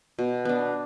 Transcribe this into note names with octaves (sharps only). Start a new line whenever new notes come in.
B2
B3 D4